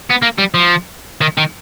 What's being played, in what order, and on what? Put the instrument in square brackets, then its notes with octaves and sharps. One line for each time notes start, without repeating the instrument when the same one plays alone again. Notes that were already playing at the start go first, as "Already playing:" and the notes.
[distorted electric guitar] B3
A#3
G3
F3
D#3
D#3